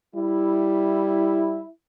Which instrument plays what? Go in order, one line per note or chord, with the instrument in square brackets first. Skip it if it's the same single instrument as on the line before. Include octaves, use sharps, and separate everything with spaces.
[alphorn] G3 [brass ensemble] E4